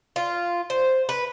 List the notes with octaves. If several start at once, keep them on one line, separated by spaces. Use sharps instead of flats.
F4
C5
B4